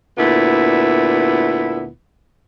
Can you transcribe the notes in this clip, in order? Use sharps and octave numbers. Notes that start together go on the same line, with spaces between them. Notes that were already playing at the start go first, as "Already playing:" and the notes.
D2 A#2 B3 E4